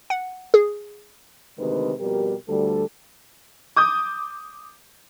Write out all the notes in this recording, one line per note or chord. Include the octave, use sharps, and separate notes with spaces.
F#5
G#4
D2 C3 D#3 G#3 B4
F2 B2 G3 G4 A#4
D2 G3 A4
D6 D#6 G6